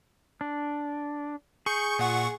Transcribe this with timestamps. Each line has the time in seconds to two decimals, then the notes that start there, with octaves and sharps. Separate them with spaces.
0.41 D4
1.66 G#4 C#6 G6 C#7
1.99 A#2 F#5 C#6